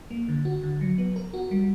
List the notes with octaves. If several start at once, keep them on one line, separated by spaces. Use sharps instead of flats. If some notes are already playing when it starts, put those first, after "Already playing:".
A#3
D3
F#4
D3
F#3
B3
A#4
F#4
G3